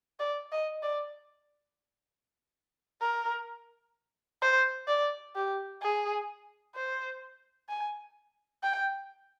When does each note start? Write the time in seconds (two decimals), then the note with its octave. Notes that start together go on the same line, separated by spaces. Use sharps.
0.20 D5
0.52 D#5
0.83 D5
3.01 A#4
4.42 C5
4.88 D5
5.35 G4
5.82 G#4
6.75 C5
7.69 G#5
8.63 G5